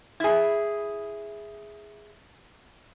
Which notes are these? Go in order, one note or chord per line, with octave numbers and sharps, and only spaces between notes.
E4 G#4